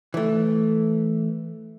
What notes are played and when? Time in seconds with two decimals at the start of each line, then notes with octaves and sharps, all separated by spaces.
0.14 E3 A3